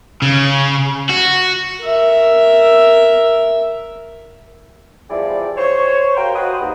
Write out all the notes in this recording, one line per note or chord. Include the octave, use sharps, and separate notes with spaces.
C#3
F#4
A#4 E5
E2 F3 G3 E4 G#4 D5
C5 C#5
F#4 A#4 F5 G5
F#4 B4 C5 F5 D#6
D#2